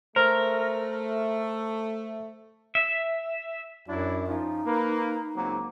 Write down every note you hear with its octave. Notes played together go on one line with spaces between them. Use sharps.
A3 A#4 C5
E5
F#2 F#3 D4 E4 C#5
F3 C#4 D#4 F4
A#3 B4
C#2 F#3 A#3 C4